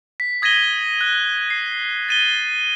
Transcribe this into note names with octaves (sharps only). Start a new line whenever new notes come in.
B6
D#6 G#6 A#6 B6 D#7 G7
F#6
C7
A6 D#7 G7